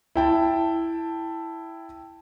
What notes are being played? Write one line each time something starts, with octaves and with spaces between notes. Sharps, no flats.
E4 G5 A5